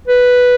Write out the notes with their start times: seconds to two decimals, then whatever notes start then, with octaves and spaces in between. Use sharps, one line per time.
0.08 B4